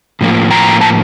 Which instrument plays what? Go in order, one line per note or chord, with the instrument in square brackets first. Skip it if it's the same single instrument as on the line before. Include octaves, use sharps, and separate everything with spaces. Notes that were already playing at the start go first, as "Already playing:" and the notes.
[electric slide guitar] A2 F3 A#3
G5 A#5
A5